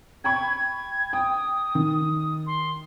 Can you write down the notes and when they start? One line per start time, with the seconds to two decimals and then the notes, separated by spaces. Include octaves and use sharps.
0.24 G5 B5 C#6 G#6
0.49 G#6
1.13 G5 D#6
1.75 D#3
2.47 C6